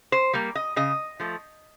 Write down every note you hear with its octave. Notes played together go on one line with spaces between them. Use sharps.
C5
G3 A#3
D#5
C#3 D#5
F3 A3